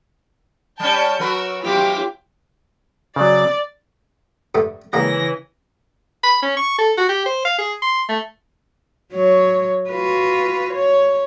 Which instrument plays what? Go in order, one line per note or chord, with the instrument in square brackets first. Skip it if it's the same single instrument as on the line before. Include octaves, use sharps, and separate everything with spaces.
[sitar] G3 C#4 [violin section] G5 A5 G6
[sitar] F#3 A#4 B4 [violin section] F#4 E6
[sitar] F#2 F#3 C4 [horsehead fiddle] F4 G4 [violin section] D6 F6 B6
[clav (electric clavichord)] C#3 F#3 [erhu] D5
[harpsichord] G2 D3 A3
[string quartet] C#3 E3 A#6 [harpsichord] G3 G#3 A#3
[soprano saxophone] B5
C#4
C#6
A4
F#4
G4
C5
F5
G#4
C6
A3
[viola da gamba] F#3 C#5
F4 F#4 B4
C#5